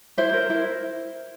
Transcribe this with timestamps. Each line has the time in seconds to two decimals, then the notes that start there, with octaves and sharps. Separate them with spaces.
0.17 E4 C5 E5
0.33 A#4
0.50 E4